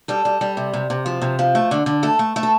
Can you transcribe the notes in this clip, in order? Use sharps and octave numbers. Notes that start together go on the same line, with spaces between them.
G3 A4
G3
G3
C3
C3
C3
F3
C3
F3
A3
D3
D3
A3 A4
A3
A3
A4